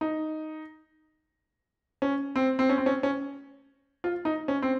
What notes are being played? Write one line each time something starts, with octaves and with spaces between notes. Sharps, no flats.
D#4
C#4
C4
C4
C#4
C4
C#4
C#4
F4
D#4
C#4
C4